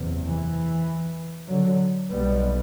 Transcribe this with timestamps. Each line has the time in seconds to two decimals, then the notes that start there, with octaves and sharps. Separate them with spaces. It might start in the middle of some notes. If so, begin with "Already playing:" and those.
Already playing: F#1 E2 C3
0.27 E3
1.49 D3 F#3
2.10 B1 B2 G3 B3